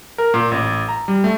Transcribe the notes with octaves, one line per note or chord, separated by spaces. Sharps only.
A#4
A#2
A1
A#5
G3
A3